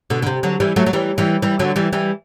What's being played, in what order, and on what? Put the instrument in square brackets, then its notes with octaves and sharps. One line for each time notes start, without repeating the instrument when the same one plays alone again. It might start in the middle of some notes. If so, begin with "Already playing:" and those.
[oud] B2 D3
D3
C3
D3 F#3
E3 G3
F#3 A3
F#3
E3 G3
E3 G3
E3 G3
D3 F#3
E3 G3
E3 G3